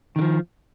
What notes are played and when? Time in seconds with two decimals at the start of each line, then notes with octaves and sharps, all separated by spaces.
0.16 D#3
0.19 D3
0.22 F3